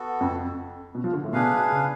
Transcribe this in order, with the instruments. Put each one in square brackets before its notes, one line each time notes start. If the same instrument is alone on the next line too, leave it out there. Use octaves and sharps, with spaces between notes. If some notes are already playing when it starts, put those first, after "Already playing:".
Already playing: [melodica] B3 F#4 A4
[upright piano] F2
B2
F3
D3
A2
[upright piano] B2 [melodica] D4 G#4 B4 F5
[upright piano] C#3